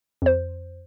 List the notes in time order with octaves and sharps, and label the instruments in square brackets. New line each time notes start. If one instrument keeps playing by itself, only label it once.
[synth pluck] F2 C5